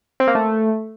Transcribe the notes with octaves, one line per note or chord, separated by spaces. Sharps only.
C4
A#3
A3